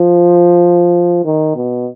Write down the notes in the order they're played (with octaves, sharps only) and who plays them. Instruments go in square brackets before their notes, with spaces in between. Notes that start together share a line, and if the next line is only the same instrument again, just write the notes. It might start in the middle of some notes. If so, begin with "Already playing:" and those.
Already playing: [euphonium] F3
D#3
B2